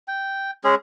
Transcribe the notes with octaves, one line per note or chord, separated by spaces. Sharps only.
G5
G#3 C#4 G#4